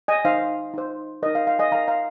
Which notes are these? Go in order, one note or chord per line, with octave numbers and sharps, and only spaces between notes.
D#5 G#5
D#4 C5 F5
D#4 C5
D#4 A#4 D#5
F5
F5
D#5 G#5
D#4 A#4 F5 A#5
F5 A#5